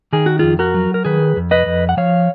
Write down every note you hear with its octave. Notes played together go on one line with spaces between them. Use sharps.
D#3 G#4
F#4
F2 F4 G#4
F#4 A#4
F#3
A#4
D#3 G#4 B4
F2
B4 D#5
F2
F#5
F3 C#5 F5